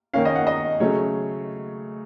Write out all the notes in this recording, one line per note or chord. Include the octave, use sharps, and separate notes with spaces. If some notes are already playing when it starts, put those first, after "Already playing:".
D#3 A#3 C#4 F5
D#5
F#5
D#5
C#3 F#3 A3 C#4 C#5